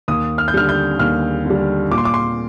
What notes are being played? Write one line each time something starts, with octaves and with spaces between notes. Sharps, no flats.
D#2 D#6
F6
G6
D3 G3 F6
G6
D#2 F6
D3 G3
A#2 D6
C6
D6
C6